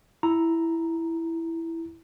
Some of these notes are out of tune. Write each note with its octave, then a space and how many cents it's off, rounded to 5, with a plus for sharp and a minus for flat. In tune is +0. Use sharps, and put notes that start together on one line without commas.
E4 +0 A#5 +0